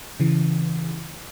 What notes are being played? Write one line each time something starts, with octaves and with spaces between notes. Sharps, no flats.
C#3 E3